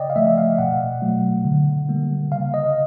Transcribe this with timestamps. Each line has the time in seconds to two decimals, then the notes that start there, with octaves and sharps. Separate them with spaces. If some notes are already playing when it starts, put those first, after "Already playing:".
Already playing: C#3 D5 D#5 G5
0.10 F5
0.16 F3 A3 E5
0.38 F5
0.58 B2 F#5
1.02 F#3 A3
1.45 D3
1.89 G3 A#3
2.31 C#3 F5
2.54 D#5